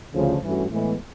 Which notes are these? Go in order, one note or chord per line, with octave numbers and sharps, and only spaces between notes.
D2 C#3 F3
G2 E3 A3 C#4 F#4
A2 E3 G#3 B3